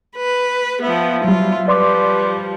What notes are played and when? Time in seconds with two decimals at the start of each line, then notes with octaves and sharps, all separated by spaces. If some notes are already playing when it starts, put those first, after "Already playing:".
0.17 B4
0.83 F3 B3 E5
1.25 F#3 G3 F4
1.68 F3 G3 B4 D5 C6 D6